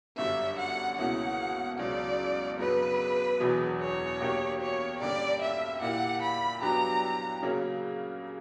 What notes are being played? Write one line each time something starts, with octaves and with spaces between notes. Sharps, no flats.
G1 F#2 D3 G3 E5
F#5
C#2 B2 A#3 C#4 E4 F#5
C#2 B2 F#3 C#4 D5
F#2 C#3 F#3 B3 D4 B4
E1 E2 B2 F#3 B3
C#5
B2 A#3 D4 G4
C#5
G2 D3 A#3 C#4 G4 D5
E5
A#2 A#3 E4 G4 F#5
B5
G2 F#3 B3 D4 G4 A#5
C#3 F#3 A#3 C#4